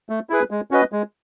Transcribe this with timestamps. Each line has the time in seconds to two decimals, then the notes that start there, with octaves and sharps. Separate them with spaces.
0.09 A3
0.30 E4 G#4 B4
0.51 G#3
0.71 C#4 F#4 B4 D#5
0.92 G#3